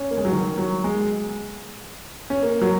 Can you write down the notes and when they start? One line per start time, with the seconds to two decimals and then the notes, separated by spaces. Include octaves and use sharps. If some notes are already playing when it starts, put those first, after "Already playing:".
Already playing: C#4
0.11 A#3
0.18 G#3
0.25 F#3
0.33 D#3
0.58 F#3
0.84 G#3
2.30 C#4
2.43 A#3
2.61 F#3